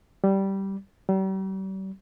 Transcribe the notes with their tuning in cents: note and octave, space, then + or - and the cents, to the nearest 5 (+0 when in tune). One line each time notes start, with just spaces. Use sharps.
G3 -10
G3 -40